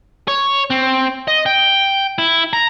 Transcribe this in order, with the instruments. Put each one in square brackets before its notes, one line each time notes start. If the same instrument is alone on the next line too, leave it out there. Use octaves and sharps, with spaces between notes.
[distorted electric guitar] C#5
C4
D#5
G5
E4
A#5